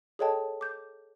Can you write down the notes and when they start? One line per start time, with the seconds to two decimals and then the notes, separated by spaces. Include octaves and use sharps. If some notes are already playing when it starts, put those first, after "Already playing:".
0.19 G#4 A4 C#5 D#5 G5 A5
0.61 D6 G6